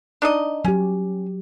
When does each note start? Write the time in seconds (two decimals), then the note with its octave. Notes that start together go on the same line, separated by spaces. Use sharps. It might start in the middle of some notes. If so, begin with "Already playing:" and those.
0.22 D4 D#4 D#5
0.65 F#3 C#4 G4